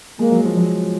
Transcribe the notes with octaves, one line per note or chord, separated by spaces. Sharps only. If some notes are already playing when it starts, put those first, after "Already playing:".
G#3 A#3
F#3
F3
F#3